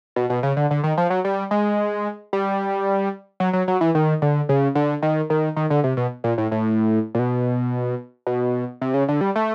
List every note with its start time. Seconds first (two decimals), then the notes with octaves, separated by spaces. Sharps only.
0.16 B2
0.30 B2
0.43 C#3
0.57 D3
0.71 D3
0.84 D#3
0.98 F3
1.10 F#3
1.25 G3
1.51 G#3
2.33 G3
3.40 F#3
3.53 F#3
3.68 F#3
3.81 E3
3.95 D#3
4.22 D3
4.49 C#3
4.75 D3
5.03 D#3
5.30 D#3
5.57 D#3
5.70 D3
5.84 C3
5.97 B2
6.24 A#2
6.38 A2
6.52 A2
7.15 A#2
7.19 B2
8.27 B2
8.82 C3
8.94 C#3
9.09 D3
9.21 G3
9.36 A3